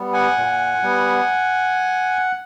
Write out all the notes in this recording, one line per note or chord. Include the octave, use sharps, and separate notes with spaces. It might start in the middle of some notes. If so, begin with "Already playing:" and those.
Already playing: G3 B3
F#5 G#5
A#2
G3 B3